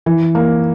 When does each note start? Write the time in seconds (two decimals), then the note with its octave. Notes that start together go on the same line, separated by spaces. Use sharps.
0.06 E3
0.35 A#3